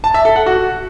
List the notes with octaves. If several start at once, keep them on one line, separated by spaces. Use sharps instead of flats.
A5
E5
A4
F#5
F#4